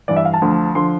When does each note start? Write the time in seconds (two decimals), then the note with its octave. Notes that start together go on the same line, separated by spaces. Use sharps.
0.08 G2 E3 D5
0.16 E5
0.25 F5
0.33 A5
0.42 D2 D3 F3
0.75 D3 F3 C6